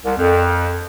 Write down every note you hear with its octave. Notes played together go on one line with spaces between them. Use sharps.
C2
F2